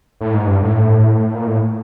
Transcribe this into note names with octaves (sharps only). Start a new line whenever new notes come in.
A2
G#2
G2
A2
A#2
A2